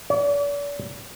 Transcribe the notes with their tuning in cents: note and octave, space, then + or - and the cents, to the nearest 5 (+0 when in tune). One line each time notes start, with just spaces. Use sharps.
D5 -40